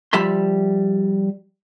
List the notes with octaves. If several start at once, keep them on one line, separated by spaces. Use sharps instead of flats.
F3 G3 E5 B5 C6